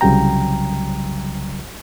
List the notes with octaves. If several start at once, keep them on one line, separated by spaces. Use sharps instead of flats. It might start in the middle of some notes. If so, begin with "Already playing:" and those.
C2 C#3 F#3 G3 G5 A#5